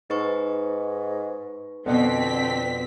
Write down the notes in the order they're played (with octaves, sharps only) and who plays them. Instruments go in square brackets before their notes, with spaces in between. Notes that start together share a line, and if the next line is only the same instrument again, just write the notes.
[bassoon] G#2 [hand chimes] D#4 B4 C#6
[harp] F2 B2 [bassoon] D3 [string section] C4 B6